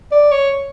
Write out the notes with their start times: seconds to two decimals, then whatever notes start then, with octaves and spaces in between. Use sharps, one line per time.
0.12 D5
0.32 C#5